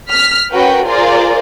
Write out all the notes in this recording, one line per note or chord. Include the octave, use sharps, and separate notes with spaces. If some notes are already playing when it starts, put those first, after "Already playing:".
F6 B6
C#4 F#4 A#4 B4 G5
F4 G#4 A#4 C5 D5